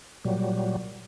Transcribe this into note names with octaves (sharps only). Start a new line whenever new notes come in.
A#2 F#3 G3